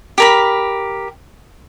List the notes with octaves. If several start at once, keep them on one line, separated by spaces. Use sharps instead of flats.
G4 A#4 B5